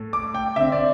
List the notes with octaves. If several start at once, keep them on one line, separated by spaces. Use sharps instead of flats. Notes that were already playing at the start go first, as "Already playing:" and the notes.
Already playing: A2 A3
D6
G5
D3 C4 E5
D5